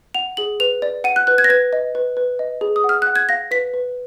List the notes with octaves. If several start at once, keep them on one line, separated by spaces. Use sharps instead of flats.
F#5 F7
G#4 F#7
B4 F7
D5
F#5 D#7
F#6
B4 F#6
G#6
A#6
B4 G#6
D#5
B4
B4
D#5
G#4
D#6
F#5
F6
F#5 F#6
G#6
F5 A#6
B4 B6
B4